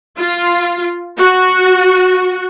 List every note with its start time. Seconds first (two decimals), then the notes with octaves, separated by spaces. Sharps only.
0.19 F4
1.19 F#4